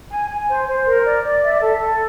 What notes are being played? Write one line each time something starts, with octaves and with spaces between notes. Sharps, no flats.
G#5
G#5
C5
C5
A#4
D5
D5
E5
A4
A4